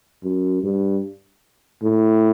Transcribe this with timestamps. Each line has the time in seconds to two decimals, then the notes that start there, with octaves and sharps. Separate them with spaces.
0.24 F#2
0.63 G2
1.83 A2